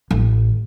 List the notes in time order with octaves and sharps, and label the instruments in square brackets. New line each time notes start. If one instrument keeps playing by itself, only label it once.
[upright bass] A1